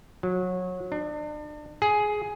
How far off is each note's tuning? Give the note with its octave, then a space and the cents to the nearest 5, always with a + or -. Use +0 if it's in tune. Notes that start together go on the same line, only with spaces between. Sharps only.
F#3 -25
D4 +35
G#4 +10